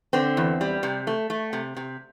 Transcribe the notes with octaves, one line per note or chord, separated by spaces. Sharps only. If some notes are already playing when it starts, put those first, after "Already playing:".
D3 C4
E2
G3
C3
A3
A3
C3
C3